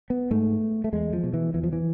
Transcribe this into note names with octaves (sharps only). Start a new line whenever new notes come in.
B3
G#2 A3
A3
E2 G#3
F3
B2
E3
E2 E3
F3
E3